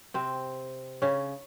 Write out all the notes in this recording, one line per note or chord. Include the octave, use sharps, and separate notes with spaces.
C3 C4
C#3 C#4